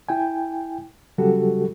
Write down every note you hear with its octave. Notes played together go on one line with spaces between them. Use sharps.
E4 G5 G#5
C#3 F#3 G3 F#4 G4 A4